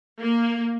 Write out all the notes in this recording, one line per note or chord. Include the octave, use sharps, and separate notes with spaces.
A#3